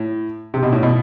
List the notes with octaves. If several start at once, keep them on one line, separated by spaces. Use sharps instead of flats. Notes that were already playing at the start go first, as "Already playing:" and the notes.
Already playing: A2
C3
B2
A2
B2